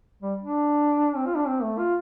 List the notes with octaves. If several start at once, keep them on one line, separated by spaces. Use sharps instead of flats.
G3
D4
C4
F4
D4
C4
A3
F4